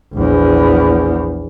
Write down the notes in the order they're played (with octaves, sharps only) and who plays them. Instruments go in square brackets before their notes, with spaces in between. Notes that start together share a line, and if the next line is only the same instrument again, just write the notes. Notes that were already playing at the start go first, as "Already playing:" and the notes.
[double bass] A#1 E2